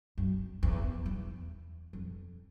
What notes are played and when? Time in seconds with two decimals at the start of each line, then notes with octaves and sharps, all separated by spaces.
0.18 F#2
0.63 E2
1.06 E2
1.93 F2